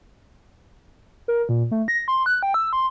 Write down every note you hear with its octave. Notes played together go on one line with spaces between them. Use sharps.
A#4
A#2
A3
A#6
C6
F#6
G5
E6
C6